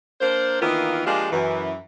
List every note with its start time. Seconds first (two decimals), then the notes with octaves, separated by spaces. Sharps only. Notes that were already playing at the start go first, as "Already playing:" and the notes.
0.21 A#3 D4 A#4 C5
0.61 D#3 E3 A#3 B3 F4
1.06 F3 G#3 A#3 D4 F4 G4
1.31 F#2 E3